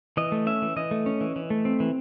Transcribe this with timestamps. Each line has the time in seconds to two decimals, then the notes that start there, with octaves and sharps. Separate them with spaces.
0.17 E3 D#5
0.32 A3
0.47 C#4 E5
0.62 E3
0.76 E3 D#5
0.91 A3
1.06 C#4
1.21 E3
1.36 E3
1.50 A3
1.65 C4
1.80 E3